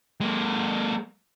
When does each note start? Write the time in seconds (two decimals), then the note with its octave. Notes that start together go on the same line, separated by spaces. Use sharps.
0.21 G#3 A#3